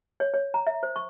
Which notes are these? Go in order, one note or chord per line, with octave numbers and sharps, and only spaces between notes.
C#5
C#5
A#5
E5
C5
C#6